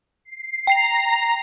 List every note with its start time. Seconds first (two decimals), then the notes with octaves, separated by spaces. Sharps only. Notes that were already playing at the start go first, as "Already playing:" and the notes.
0.25 C7
0.67 G5 A#5 C7 F7